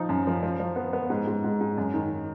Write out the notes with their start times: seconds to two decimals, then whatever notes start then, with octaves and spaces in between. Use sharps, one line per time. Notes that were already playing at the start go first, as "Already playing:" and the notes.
Already playing: F3 D#4
0.09 F#2
0.27 F3
0.43 F3
0.60 F3
0.76 B3
0.93 B3
1.10 G#2
1.27 G#2
1.44 G#2
1.61 G#2
1.78 F#2
1.94 D#3